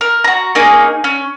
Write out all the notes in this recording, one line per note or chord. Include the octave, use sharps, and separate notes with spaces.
A#4
F#4 A#5
A#3 C#4 D#4 G#4
C#4